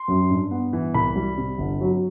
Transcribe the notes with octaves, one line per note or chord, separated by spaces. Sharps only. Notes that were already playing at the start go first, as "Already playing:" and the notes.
Already playing: C6
F#2
G2
B3
E3
C2 B5
G3
C3
G1
F#3